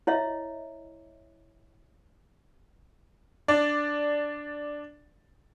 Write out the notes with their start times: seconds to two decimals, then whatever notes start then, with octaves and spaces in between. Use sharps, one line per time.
0.07 E4 C#5 D#5 E5
3.48 D4 D5